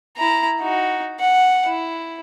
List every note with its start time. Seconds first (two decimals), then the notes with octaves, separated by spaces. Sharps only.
0.17 E4 A#5
0.60 D#4 F#4
1.19 F#5
1.66 E4